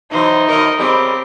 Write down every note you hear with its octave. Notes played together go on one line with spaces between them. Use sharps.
B2 E3 F#3 D#4 C5
B2 D#3 F#3 A#4 D#5
C#3 G3 C4 C#4 G4